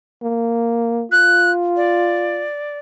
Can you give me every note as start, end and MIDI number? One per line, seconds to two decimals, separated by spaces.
0.23 1.05 58
1.12 2.46 65
1.12 1.51 90
1.76 2.79 74